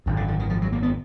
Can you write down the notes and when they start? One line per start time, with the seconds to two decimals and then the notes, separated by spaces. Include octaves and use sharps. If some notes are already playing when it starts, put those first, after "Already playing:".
0.06 G#1 F#2 D3
0.17 D3
0.28 D3
0.39 D#3
0.50 F3
0.62 F#3
0.72 A#3
0.83 B3